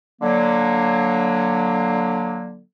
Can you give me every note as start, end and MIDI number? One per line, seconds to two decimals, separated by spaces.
0.22 2.60 50
0.22 2.60 54
0.22 2.60 58